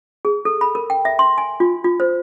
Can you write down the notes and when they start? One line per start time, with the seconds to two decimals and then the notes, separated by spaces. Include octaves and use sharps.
0.25 G#4
0.45 A4
0.61 B5
0.75 A#4
0.90 G5
1.05 E5
1.19 C6
1.38 G#5
1.60 F4
1.84 F4
2.00 C5